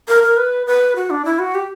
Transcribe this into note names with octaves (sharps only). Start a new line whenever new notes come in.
A#4
A#4
B4
B4
F#4
D4
E4
F#4
G4